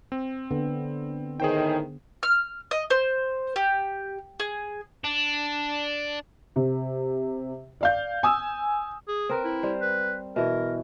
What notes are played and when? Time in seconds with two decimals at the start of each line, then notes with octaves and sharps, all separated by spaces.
0.12 C4
0.51 D3 B3
1.40 A2 D#3 G#4 C5 G5
2.23 F6
2.71 D#5
2.90 C5
3.56 G4
4.40 G#4
5.04 D4
6.56 C3
7.81 D5 F5 G6
8.23 G#5 D#6 E6
9.08 G#4
9.29 C4 A#4 B4
9.44 E4
9.63 G3 C5
9.81 B4
10.36 B2 E3 A#4